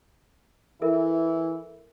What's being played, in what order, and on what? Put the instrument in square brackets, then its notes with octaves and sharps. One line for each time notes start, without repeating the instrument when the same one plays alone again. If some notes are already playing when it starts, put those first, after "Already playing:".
[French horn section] E3 E4 [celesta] A4 A#4 E5